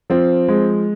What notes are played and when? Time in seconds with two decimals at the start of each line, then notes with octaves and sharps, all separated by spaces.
0.10 F3 C4
0.48 G#3